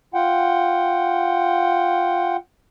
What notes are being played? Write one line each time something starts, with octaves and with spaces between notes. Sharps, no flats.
F4 F#5 G5